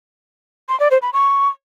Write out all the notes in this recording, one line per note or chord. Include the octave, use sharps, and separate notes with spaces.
C6
D5
C5
B5
C#6